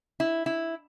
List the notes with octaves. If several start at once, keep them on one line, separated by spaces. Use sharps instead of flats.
E4
E4